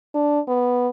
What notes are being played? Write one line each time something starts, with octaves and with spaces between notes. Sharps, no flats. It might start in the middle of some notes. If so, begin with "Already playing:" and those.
D4
B3